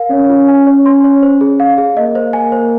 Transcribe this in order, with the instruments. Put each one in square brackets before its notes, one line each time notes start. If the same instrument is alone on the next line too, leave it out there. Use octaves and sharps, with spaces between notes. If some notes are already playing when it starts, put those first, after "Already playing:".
Already playing: [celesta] A#4 F5
[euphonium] C#4 [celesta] C#5
[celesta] F4
G#5
C#5
C6
C#5
C5
G#4
F5
G#4
[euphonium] A#3 [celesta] D#5
[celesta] C5
G#5
C5